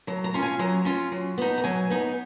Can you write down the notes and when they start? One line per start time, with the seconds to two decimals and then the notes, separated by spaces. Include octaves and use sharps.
0.07 F#3 A#5
0.24 A#5
0.34 C#4 F4
0.42 G#5
0.59 F#3 A#5
0.85 C#4 F4
1.12 F#3
1.38 B3 D#4
1.58 A#5
1.64 F#3 G#5
1.90 B3 D#4